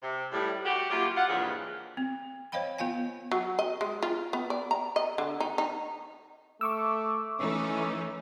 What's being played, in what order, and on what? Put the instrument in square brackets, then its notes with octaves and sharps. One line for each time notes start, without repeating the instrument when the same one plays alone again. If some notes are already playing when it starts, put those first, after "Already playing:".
[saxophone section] C3
A2 G3
F#4 G4
F#3 A#3 E4 F4 G4
F4 F#5
G2 A#2 C#3 E3 F3 G#3
[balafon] C4
C5 C#5 D#5 F5 G5 B5
B3 F4 F5 G5 G#5
[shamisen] F#3
D#5
G#3
F4
B3
D5
A#5
D#5
D3
D#4
D#4
[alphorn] A3 [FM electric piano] C#6 D6 E6
[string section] E3 A3 D#4 [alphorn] C#4